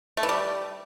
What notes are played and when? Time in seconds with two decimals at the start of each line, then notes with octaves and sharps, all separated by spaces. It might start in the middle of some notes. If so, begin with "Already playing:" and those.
0.17 A3
0.23 E3
0.29 G3